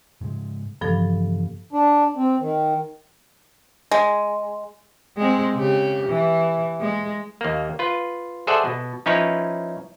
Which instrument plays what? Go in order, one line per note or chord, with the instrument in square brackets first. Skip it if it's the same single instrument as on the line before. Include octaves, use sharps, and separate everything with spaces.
[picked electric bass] G#2 C#3 G#3
[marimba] G2 F3 A4 [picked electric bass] C#3 E3 A#3
[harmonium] D4
C4
D#3
[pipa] G#3
[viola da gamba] G#3 C4
C#3 G4
E3
G#3
[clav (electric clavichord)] D#2 A#3
F4 B4
G#4 A4 C5 D5 E5 F#5
B2
F3 C#4 D#4 E4 B4 C#5